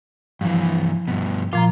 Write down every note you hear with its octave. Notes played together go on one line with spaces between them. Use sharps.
G2 E3 F3
G2 B2
A#2 F3 F4 A#5